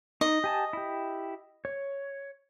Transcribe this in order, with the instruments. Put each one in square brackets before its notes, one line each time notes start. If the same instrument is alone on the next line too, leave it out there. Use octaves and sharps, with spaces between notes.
[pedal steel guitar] D#4 [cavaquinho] D#5
[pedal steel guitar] G4 G#5 A5
E4 G4
C#5